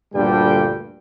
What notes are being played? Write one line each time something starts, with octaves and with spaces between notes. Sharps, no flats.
D2 G2 A#2 D3 G3 G5